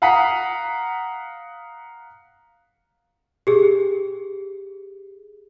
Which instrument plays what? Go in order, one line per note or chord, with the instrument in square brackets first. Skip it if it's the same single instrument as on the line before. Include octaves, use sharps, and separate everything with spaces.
[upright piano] F5 F#5 A#5 D#6 B6
[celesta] G4 G#4